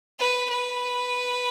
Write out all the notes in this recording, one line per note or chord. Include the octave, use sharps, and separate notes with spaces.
B4
B4